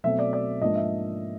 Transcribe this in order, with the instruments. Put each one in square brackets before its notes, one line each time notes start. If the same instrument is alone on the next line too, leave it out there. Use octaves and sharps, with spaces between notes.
[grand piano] B2 F#3 A3 C4 E5
D5
D5
G#2 F3 A#3 D4 D#5
E5